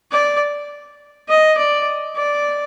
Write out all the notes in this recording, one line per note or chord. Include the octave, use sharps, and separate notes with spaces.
D5
D#5
D5
D5